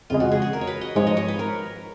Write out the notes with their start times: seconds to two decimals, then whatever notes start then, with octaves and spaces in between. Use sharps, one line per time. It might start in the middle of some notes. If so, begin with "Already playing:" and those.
0.10 F2 C#3 G#3 F4
0.20 F#4
0.32 G#4
0.42 G#4
0.53 A#4
0.61 C#5
0.67 B4
0.81 D#5
0.96 G#2 F3 G#3 C#5
1.07 D#5
1.17 C#5
1.28 B4
1.39 A#4